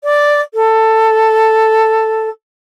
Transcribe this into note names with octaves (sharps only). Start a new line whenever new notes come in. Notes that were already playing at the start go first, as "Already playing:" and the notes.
D5
A4